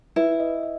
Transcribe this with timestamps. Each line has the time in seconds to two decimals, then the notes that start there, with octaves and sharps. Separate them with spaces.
0.16 E4 B4
0.40 D#5
0.63 D#5